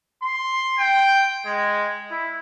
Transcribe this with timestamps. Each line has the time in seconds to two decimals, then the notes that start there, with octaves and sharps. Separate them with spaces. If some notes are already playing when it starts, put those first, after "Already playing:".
0.22 C6
0.78 G5
1.45 G#3
2.11 E4